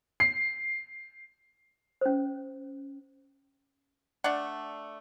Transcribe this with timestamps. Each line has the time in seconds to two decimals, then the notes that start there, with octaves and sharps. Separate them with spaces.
0.20 C7
2.01 C#4 C5
4.24 A3 D4 D5 F#5